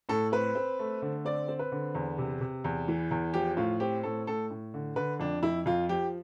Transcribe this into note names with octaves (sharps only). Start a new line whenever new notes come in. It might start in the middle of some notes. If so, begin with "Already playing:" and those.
A2 A4
C4 B4
C4
A3
D3
C4 D5
C4
B4
D3
E2
C3
C3
E2
E3
E2
F3 G4
A2 F4
C4 G4
A2 A4
A2 A4
A2
D3
D3 B4
F2 D4
F2 E4
F2 F4
F3 G4